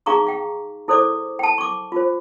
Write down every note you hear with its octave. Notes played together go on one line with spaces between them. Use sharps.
D#4 G#4 F5 A#5 C#6 D6
F5 G5
E4 A4 C5 D5 D6
G5 A5
C#6 D6
F4 C5